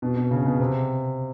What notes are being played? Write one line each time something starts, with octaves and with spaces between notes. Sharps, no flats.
B2
B2
C#3
B2
C3